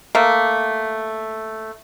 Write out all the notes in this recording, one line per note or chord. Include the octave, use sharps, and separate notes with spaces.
A3 A#3